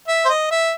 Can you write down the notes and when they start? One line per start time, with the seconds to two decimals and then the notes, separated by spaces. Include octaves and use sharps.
0.08 E5
0.25 C5
0.29 D#5
0.51 E5